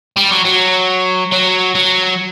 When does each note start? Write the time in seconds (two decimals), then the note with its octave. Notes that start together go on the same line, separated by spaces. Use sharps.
0.17 G3
0.31 F#3
0.45 F#3
1.32 F#3
1.75 F#3